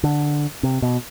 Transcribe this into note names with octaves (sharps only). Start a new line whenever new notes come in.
D3
C3
B2